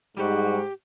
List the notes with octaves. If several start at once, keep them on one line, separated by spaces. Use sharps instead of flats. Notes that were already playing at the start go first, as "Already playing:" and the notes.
G#2 G3 F#4 G4